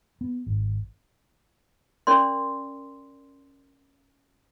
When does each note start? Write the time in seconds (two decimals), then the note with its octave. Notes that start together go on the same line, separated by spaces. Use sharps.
0.21 B3
0.46 G#1
2.07 C#4 A#4 D5 C6